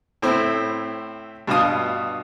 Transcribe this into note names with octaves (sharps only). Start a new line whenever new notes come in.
A2 C4 E4
G2 B2 F4 F5 D#6